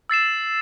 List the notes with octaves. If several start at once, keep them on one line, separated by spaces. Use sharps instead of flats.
E6 A6 C7 E7